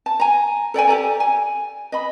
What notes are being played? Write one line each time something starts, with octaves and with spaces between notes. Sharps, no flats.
A5
G#5 A#5
A4 D5 G5 G#5
G4 A4 D5 A#5
G#5
D#5 B5